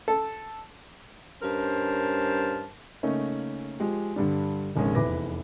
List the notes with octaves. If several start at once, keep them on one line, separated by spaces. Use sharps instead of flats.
A4
G2 C#4 A#4 C5 A5
C#3 A3 A#3 C#4 D#4
F3 G#3 G4
G2 D3 G3 D4
F1 A#1 D#3 G#3 C#4
F1 E2 E4 B4 D6 A#6